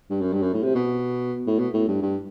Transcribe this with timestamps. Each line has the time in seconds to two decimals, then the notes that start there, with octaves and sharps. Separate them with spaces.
0.10 G2
0.21 F#2
0.32 G2
0.42 F#2
0.54 A2
0.63 C3
0.75 B2
1.47 A2
1.58 B2
1.73 A2
1.88 G2
2.02 G2